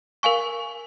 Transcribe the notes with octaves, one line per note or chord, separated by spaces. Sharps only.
A#4 F5 G#5 C#6